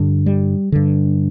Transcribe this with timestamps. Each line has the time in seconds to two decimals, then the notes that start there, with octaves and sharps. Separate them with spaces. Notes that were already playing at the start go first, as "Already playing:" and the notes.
Already playing: G2 D3
0.26 G3
0.72 G2 D3